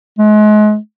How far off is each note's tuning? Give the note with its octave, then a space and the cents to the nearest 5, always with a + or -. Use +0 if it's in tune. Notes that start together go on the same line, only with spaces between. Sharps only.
G#3 +35